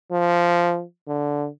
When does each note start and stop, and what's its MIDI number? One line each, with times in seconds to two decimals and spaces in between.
0.12 0.83 53
1.07 1.47 50